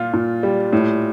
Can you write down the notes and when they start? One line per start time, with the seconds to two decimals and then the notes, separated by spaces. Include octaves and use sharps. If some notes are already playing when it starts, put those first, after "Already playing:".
Already playing: A#2 F4
0.13 A#2
0.43 G3
0.73 A2